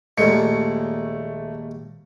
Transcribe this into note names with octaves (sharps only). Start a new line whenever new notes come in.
A#1 D#2 G#3 A3 C#7